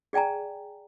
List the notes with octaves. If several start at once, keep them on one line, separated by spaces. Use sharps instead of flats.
G#4 D5 G5 G#5 A#5